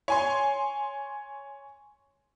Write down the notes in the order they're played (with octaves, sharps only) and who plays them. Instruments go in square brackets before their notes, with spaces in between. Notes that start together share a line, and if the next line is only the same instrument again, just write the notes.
[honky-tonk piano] C#5 G#5 C6